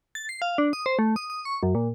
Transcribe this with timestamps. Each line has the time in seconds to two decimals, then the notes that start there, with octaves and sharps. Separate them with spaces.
0.15 A6
0.29 C7
0.42 F5
0.58 D4
0.73 D#6
0.86 C5
0.99 A3
1.16 D#6
1.30 D#6
1.45 C#6
1.63 F#2
1.75 A#2